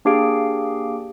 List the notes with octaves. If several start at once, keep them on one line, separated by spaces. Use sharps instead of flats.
A#3 D4 G4 G#4 F5 D7